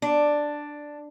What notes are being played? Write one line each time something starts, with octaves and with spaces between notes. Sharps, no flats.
D4